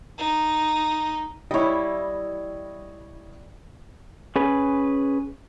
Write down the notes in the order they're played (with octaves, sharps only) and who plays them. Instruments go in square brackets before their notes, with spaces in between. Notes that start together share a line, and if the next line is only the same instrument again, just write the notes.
[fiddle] D#4
[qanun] G3 E4 [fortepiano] C#5 D#5
[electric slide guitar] C#4 G#4 B4